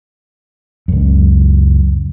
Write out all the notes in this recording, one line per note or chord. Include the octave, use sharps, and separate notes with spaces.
C#2 F#2